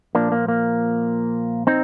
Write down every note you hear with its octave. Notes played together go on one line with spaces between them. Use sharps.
A#2 F3 A#3 D4
A#3
A#3
C4 D#4